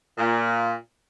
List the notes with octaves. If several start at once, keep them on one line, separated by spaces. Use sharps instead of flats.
A#2